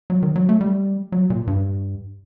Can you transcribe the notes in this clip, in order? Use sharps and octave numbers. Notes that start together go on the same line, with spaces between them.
F#3
D#3
F#3
A3
G3
F#3
A#2
G2